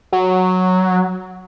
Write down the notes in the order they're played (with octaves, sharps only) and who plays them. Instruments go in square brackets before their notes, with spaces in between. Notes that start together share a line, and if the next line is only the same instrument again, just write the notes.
[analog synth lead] F#3